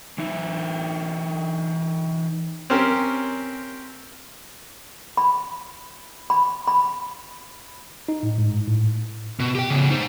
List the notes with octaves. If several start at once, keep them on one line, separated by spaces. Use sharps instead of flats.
E3 D#4 E5
C4 C#4 G4 A#4
B5
B5
B5
D#4
A2
G#2
A2
B2
G4 G5
C#3 B3
D#4 C5